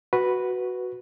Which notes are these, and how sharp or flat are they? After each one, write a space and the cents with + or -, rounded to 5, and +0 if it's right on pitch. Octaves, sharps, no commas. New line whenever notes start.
F#4 +0 B4 +0